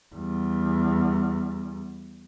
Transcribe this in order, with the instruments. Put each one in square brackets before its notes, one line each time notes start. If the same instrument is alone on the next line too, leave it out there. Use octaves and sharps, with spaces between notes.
[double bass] E2 G3